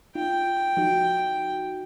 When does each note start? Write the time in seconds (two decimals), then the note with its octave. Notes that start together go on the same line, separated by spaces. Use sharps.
0.15 D#4 F4 G5
0.77 F3 D#4 F#4